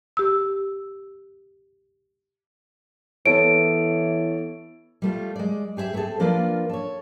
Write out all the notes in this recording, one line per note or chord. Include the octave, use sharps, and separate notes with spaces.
G4 E6
E3 B3 A4 C#5 D7
G3 A3 F4
G#3 D5
G4 G#4 C5 E5
A3 B3 C4 G#4 A4
F3 A#3 D4 F4 B4 D5
A4 C#5